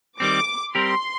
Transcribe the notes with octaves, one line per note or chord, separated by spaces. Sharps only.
D#3 G3 C4 D6
G3 C4 G4 A#4 C6